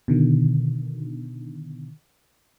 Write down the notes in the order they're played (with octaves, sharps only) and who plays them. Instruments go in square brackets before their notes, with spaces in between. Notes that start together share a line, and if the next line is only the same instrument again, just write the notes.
[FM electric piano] B2 D3 D#3